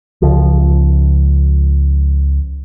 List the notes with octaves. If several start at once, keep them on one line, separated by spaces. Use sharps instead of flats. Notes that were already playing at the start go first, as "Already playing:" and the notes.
C#2 F3